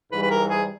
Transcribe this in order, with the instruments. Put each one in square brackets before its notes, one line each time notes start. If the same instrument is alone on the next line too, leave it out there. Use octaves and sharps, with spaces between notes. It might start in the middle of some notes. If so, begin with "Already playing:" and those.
[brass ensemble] G#2 E3 G3 [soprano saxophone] B4
[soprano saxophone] B4
A#4
G#4